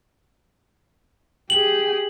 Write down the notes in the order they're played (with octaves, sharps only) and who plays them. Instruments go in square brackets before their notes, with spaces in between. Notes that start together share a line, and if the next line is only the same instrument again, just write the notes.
[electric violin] G4 G#4 [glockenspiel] F#7